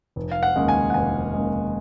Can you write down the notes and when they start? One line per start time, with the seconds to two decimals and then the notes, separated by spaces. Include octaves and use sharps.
0.16 F1
0.31 F5
0.43 F#5
0.56 D#2 C#3 G#3
0.68 G#5
0.90 F#5
0.94 F1 G#5
1.34 D#2 C#3 G#3